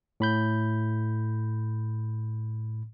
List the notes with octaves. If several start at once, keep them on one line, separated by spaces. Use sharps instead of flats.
A2 B5 G6